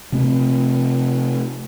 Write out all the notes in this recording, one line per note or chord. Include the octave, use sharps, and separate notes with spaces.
C3 A3 C4